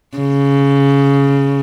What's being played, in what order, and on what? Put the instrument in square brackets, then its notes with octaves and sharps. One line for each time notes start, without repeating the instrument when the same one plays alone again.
[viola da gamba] C#3